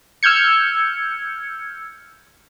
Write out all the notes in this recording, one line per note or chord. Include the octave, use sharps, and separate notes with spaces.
E6 F6 G6 G#6 C#7